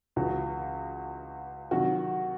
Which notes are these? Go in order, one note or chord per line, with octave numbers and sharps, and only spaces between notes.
C#2 C#3 E3 F#4
C3 D#3 F#3 F#4